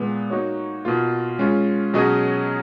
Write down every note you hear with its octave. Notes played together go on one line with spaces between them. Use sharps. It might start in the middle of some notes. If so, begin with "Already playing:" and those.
Already playing: A#2 G#3 B3
A#3 D#4 F#4 C#5
B2 A#3 F4
G#3 C#4 F4
B2 F#3 C#4 G#4 D#5